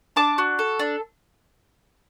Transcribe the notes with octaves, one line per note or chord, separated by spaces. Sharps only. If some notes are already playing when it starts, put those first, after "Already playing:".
D4 A5 D6
F#4
A4
D4